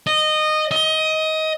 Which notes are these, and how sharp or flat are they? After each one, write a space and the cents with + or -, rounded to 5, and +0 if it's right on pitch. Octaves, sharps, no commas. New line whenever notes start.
D#5 -15
D#5 +20